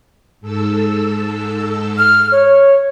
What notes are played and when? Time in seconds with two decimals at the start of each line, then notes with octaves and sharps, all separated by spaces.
0.41 G#2 A4 E6
1.98 F6
2.32 C#5